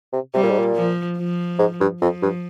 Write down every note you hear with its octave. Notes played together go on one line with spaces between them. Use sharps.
C3
C3 G3
A#2
G#2
A#2
F3
F3
G#2
G2
F2 F3
G2